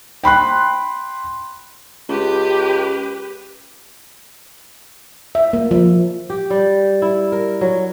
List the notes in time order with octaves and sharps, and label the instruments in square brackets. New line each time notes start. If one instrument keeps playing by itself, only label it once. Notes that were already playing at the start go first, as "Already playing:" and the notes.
[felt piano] G5 B5 C6 F#6
[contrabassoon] C#2 [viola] G4 B4
[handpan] E5
A#3
F3
[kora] G4
G3
E4
A#4
F#3